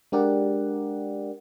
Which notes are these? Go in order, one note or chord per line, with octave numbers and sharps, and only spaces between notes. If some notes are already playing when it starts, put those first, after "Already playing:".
G#3 D4 G4 A#4 D5 F#5